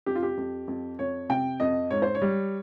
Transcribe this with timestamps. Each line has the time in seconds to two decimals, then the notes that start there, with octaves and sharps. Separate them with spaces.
0.06 F2 G4
0.15 F4
0.23 G4
0.37 F2
0.68 F2
0.99 F2 C#5
1.29 C3 G5
1.60 F2 D#5
1.90 G#2 C#5
2.02 C5
2.15 C#5
2.22 G3